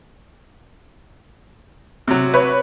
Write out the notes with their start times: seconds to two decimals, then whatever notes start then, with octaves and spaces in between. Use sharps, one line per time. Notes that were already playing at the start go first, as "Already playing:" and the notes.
2.08 C3 F#3
2.34 B4 C#5